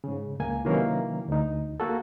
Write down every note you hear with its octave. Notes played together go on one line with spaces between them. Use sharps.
G#2 C#3
C#2 A#3 G#5
C3 D#3 E3 F#3 A#3 C#4
D2 D#4
A#3 F#4 A4